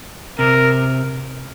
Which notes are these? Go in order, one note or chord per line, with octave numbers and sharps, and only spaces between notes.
C3 A#4